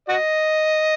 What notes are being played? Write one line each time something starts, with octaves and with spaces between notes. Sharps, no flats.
F#4 D#5